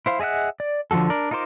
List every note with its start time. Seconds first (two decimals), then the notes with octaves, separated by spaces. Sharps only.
0.06 E4 C5 F5
0.20 G#4 D#5 E5 F#5 F#6
0.60 D5
0.91 D3 F3 G3 F#4 A4
1.10 D4 A#4 D5
1.31 D#4 F4 A#4 C5 D6